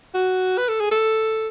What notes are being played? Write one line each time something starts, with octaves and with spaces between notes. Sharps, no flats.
F#4
B4
A4
G#4
A4